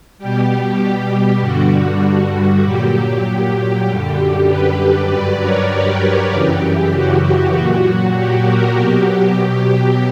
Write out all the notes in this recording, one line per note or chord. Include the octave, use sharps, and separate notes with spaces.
B2 G3 G4
G2 D3 G3 F#4
A#2 F#3 G4
F#2 D3 G3 G4
G4 B4
G2 F#3 B4 D5
A#4 C#5
G4
F#2 C#3 E3
F#4
A#2 F#3
G4
F#4 A#4
B2 F#3 G4